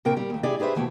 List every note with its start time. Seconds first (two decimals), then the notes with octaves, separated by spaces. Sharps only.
0.05 A#2 C#3 C4 A#4 G5
0.17 G3
0.30 D#2 A3
0.43 E4 G4 G#4 D5
0.60 G4 G#4 B4 C5 E5
0.75 D#2 B2 E3 A3 G5